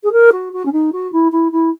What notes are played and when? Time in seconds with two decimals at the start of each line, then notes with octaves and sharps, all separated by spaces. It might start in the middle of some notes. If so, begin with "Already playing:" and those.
0.04 G#4
0.12 A#4
0.32 F#4
0.53 F#4
0.65 C#4
0.72 D#4
0.93 F#4
1.12 E4
1.32 E4
1.52 E4